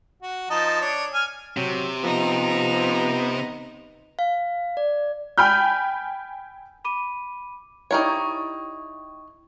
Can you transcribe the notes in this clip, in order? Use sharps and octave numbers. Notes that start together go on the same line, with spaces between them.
F#4
F3 D#4 A5
D4 C#5
G#5 F6
C3 F#3
F3 B3 D#4 A#5
F5
D5
G5 G#5 B5 F6 G6
B5 D6 D#7
D#4 E4 G4 A#4 C#5 D5 C#6